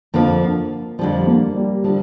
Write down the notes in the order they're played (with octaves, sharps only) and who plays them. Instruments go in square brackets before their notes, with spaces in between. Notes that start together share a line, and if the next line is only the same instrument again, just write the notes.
[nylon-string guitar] F2 D3 F3 [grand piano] A#3
[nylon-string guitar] F2 D3 F3 [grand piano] G3
[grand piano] A#3
G3
[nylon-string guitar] D3 F3 [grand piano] G3